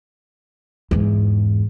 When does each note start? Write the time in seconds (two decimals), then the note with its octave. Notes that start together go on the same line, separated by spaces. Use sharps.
0.91 E2 G#2